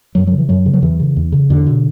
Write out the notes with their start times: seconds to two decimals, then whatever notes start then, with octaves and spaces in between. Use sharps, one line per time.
0.15 F#2 F#3
0.27 C#3 F#3
0.38 E3
0.49 F#2 F#3
0.66 C#3
0.73 F#3
0.82 E2 E3
1.00 C#3
1.16 E2
1.32 C#3
1.50 E2 D3
1.67 B2